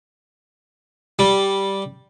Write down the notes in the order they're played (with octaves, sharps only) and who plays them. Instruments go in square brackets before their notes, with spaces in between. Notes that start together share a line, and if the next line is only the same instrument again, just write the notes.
[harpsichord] G3